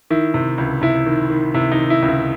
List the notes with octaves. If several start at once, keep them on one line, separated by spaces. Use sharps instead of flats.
D#3 E4
C3
C#2
C3 E4
D#3
D#3
C3 E4
D#4
D#3
E4
C#2
E4